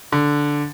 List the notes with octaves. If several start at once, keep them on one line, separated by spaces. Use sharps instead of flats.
D3